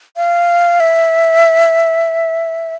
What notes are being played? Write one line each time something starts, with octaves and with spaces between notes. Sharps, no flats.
F5
E5